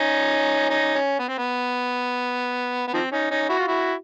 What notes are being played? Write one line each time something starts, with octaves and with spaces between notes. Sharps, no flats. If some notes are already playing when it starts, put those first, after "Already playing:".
Already playing: C#4 D#4
C#4 D#4
C#4
B3
C4
B3
B3
D#3 F3 C4
C#4 D#4
C#4 D#4
E4 F#4
F4
E4 F#4